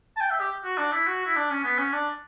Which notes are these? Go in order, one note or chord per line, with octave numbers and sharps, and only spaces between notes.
A5
G5
E5
G4
F#4
D4
E4
F#4
E4
D4
C#4
B3
C#4
D4